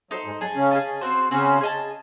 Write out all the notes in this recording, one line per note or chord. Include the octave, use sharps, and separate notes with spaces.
F#3 D#4 A4 C5
G#2 G#3
F#3 G#4 D#5 A5
C#3 C#4
G#4 D#5 A5
C4 F#4 C5
C#3 C4 C#4 F#4 C5
G#4 D#5 A5